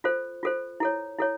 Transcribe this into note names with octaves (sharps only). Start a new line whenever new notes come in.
F4 A4 C5
F4 A4 C5
E4 A4 C#5
E4 A4 C#5